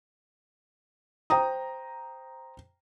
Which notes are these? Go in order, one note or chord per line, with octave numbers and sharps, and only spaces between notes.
C5 G5 A#5 D#6